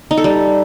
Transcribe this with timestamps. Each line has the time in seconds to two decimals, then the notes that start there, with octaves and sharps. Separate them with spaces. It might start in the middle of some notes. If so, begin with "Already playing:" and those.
0.11 D#4
0.17 A4
0.24 G3